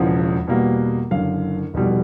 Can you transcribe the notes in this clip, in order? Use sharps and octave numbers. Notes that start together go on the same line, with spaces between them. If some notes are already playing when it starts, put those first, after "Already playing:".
Already playing: E1 E2 C#3 F3
E2 B2 G3 A#3
F#1 F#2 D3 F5
F1 E2 B2 G3